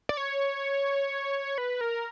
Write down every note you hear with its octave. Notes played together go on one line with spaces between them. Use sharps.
D5
C#5
B4
A#4